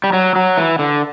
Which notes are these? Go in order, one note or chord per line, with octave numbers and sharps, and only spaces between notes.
G3
F#3
F#3
E3
D3